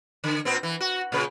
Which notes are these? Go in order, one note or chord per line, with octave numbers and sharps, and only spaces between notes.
D3
A#2 B3 C4
E3
F#4
A#2 C#3 B4